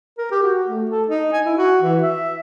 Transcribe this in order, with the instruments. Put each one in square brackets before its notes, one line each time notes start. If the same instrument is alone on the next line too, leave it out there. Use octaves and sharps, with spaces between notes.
[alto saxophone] A#4
G4
F#4
A3
A4
D#4
G#5
E4
F#4
E3
E5